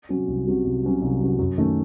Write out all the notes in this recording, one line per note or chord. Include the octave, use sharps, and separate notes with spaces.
C3 F#3 C#4 F#4
C2
C3 F#3 C#4 F#4
C2
C3 F#3 C#4 F#4
C2
C3 F#3 C#4 F#4
F#2
D#3 A3 C#4